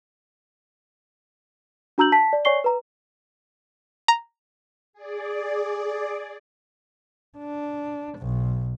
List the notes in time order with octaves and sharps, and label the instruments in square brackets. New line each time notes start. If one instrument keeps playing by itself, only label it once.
[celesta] D4 F#4 A#5 E6 G6 F#7
A5 B6
D5
C#5 D5 G#5 C#6 C7 G7
B4 A#5
[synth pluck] A#5
[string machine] G#4 D5
[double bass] D4
B1